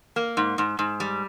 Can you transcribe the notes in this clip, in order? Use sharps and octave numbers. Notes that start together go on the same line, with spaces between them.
A#3
G#2
G#2
G#2
G3